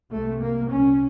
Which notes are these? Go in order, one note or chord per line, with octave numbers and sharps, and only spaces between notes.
C2 C3 A3
A#3
C2 A#2 C#4